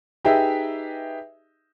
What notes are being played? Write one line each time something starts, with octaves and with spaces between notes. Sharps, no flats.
D#4 G4 G#4 B4 D#5 E5